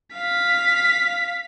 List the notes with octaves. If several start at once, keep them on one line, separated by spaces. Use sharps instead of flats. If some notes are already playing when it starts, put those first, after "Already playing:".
F5 B6